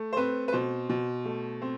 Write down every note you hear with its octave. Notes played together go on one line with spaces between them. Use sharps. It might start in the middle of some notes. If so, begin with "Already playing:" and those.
Already playing: A3
C5
C4 B4
B4
B2 C5
B2
A3
C4